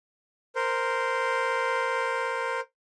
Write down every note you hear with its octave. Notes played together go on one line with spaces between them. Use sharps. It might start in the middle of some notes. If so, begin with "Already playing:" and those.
A#4 C5